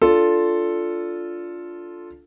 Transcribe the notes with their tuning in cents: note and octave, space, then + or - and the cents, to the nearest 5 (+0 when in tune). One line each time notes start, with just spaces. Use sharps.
D4 -10 F4 +0 A4 +0